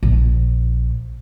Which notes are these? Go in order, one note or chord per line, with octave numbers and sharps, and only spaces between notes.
A#1